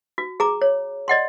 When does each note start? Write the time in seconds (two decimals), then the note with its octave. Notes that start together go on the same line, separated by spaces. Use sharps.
0.18 F#4
0.40 G#4 A#5 D6
0.62 C#5
1.08 D5 D#5 F#5 C6